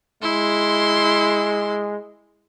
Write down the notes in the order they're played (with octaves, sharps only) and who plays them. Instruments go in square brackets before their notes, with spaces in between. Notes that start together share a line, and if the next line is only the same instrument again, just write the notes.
[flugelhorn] G#3 [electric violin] E4 C6